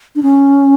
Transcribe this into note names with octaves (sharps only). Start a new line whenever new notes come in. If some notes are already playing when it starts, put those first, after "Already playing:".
D4
C#4